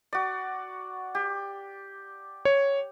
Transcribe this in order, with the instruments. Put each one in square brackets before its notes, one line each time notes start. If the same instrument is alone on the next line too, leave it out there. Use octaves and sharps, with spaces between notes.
[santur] F#4 D5
G4
[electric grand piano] C#5